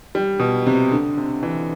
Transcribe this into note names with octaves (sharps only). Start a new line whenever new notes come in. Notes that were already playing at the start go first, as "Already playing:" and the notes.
G3
B2
C3
D3
C3
E3